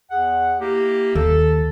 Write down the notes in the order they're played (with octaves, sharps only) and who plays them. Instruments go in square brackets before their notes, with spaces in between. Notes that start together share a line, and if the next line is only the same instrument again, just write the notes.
[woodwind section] E2 G#4 F#5
A#3 E4 G4
[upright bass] D#2 [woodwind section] A4